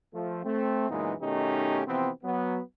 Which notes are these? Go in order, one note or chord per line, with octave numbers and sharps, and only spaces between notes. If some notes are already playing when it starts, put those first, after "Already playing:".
F3 A3
A3 C4
F#2 A#2 E3 G#3 B3 D#4
B2 D#3 A3 C#4 D#4 G4
C3 E3 F3 B3 C4
F#3 B3